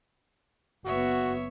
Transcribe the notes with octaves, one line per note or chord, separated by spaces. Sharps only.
F#1 B3 F#4 C#5 E5